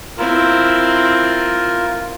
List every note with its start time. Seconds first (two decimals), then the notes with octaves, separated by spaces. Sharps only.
0.18 C4 E4 F4 A#4